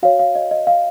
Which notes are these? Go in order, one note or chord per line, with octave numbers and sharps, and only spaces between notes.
F#4 C#5 F5
F5
D#5
D#5
F5